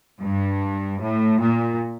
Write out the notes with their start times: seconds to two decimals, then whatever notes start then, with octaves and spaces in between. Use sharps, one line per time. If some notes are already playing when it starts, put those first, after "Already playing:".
0.20 G2
1.00 A2
1.40 A#2